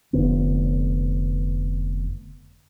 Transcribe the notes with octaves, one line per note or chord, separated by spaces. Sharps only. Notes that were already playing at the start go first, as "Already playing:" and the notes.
F1 F#2 D3 B3